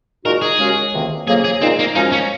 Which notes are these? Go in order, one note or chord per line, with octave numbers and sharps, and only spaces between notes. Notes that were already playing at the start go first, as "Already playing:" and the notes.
A#2 G#3 D#4 F#4 A#4
G#4
D#2 C#3 G#3 C#4 F#4
C#2 C3 D#3 A#3
F2 C#3 F#3 A#3 G#4
G#4
A#2 G#3 C4 D#4
A#3
F#2 F3 G#3 C#4 D#4
C#4